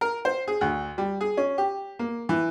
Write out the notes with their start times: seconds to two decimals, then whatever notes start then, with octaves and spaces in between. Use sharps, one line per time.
0.01 A#4
0.25 C5
0.48 G#4
0.61 D2
0.98 G3
1.21 G#4
1.37 C#4
1.58 G4
1.99 A#3
2.29 E3